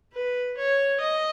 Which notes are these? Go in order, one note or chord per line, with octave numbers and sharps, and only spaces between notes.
B4
C#5
D#5